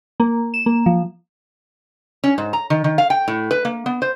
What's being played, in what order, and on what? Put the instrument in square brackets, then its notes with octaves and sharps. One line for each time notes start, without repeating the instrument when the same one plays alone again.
[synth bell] A#3
E7
A#3
F3
[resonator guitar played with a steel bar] C#4
G#2
A#5
D#3
D#3
F5
G5
A2
B4
A#3
B3
C5